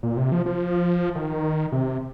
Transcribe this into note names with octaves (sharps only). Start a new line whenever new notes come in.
A#2
C3
F3
F3
D#3
C3